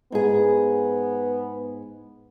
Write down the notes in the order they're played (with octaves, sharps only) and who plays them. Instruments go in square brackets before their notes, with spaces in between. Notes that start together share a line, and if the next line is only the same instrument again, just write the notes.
[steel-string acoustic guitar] G#2 G#4 [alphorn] B3